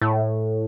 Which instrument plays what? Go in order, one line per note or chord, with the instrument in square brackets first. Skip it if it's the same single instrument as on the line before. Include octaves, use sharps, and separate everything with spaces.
[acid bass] A2